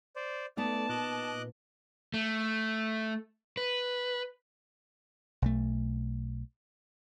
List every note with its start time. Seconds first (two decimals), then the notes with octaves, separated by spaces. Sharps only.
0.16 C5 D5
0.57 A3 B3 D#4 D5 A5
0.89 A#2 D#5 D6 F#6
2.14 A3
3.57 B4
5.42 B1 A3